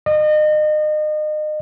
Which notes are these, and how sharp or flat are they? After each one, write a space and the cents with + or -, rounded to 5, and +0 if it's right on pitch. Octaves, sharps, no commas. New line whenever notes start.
D#5 -35